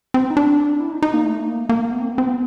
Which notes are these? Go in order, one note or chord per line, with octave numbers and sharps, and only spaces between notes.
C4
D#4
D4
E4
D#4
D#4
A#3
A3
A#3
A#3
B3
C4
B3
C4
B3